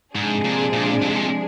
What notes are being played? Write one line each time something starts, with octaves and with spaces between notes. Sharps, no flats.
G#2 C3 F3 G#3 D4 G#4
A#2
A#2
A#2
G#2
A#2